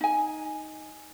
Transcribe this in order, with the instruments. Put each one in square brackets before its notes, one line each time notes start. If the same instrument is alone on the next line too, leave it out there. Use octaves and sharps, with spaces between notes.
[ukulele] D#4 G#5